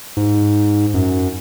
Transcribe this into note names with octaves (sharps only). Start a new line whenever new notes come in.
G#2
F#2